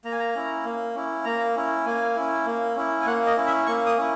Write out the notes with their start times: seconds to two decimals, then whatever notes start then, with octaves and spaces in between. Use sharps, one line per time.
0.04 A#3 A#5
0.12 G#5
0.20 A#5
0.35 C#4 E4
0.65 A#3
0.95 C#4 E4
1.25 A#3 A#5
1.56 C#4 E4
1.85 A#3 G#5
2.16 C#4 E4
2.46 A#3
2.76 C#4 E4
3.01 G#5
3.06 A#3 F#5
3.26 D#5
3.37 C#4 E4
3.46 E5
3.67 A#3 C#6
3.86 D#6
3.98 C#4 E4